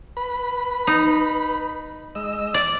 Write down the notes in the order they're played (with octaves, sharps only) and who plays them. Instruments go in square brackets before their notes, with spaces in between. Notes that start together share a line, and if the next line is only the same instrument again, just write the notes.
[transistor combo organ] B4 B5
[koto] D#4
[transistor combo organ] G#3 D#5 E6
[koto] D5